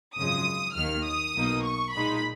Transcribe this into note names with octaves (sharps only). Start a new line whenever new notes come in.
G#1 F#2 C#3 F3 G#3 D#6
D#2 D#3 A#3 F6
D#6
B1 B2 A#3 D#4
C#6
A#2 G#3 D#4 B5